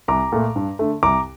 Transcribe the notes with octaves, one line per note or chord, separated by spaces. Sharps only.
C2 A#5 D6
A#2 A3
G2
D3 A3
C2 A#5 D6